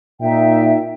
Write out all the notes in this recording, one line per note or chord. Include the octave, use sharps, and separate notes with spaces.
A#2 D#4 E5 G5